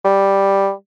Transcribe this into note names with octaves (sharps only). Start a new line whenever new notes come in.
G3